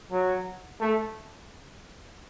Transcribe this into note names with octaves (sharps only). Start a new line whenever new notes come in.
F#3
A3